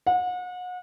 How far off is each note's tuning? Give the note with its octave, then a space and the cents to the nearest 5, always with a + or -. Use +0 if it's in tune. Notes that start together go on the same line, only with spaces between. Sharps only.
F#5 -35